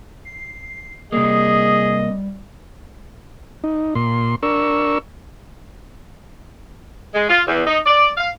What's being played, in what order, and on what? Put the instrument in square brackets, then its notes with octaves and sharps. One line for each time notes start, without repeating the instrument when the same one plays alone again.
[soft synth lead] C7
[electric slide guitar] C3 A#3 [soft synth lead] G3 [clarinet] G#4 [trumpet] D#5
[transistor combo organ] D#4
A#2 C6
D4 A#4 C#6 E6
[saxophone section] G#3
F4
E2
D#4
D5
F5